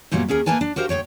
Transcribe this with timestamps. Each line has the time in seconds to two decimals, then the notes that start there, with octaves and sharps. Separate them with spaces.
0.12 F#2 A#2 F#3 G3 B3
0.28 D#2 C#4 G#4 A#4
0.46 A2 A#3 A#4 B4 G#5 A5
0.61 D4
0.76 F#4 G4 A#4 C5 F5
0.89 D2 F3 C#5 G5